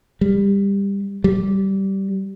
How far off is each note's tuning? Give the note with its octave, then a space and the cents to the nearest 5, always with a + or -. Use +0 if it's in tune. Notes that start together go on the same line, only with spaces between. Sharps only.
G3 +20
G3 -15